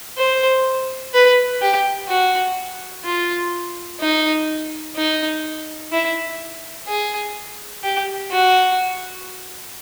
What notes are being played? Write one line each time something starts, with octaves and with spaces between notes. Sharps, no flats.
C5
B4
G4
F#4
F4
D#4
D#4
E4
G#4
G4
F#4